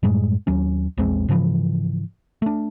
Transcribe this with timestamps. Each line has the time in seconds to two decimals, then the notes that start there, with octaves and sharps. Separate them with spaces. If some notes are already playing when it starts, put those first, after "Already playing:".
0.03 F#2 A2 G3 G#3
0.47 D#2 F#3 C#4
0.98 A#1 E2 G#3 C4
1.29 G#2 C#3 E3 F3
2.42 A3 D4